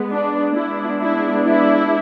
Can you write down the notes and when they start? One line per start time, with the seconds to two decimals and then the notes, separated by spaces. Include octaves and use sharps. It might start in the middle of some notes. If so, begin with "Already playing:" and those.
Already playing: G#3 B3
0.12 D4
0.55 G#3 B3 D4 E4
1.00 E4
1.45 E4